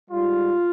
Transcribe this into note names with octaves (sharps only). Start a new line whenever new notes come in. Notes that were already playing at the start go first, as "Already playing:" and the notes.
G#2 G3 F4